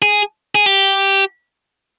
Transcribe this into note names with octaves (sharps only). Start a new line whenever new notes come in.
G#4
G#4
G4